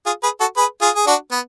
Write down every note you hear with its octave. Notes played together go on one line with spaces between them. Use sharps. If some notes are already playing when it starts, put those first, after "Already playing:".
F4 G#4
G#4 B4
F#4 A4
G#4 B4
F4 G#4
G#4
D4 F#4
B3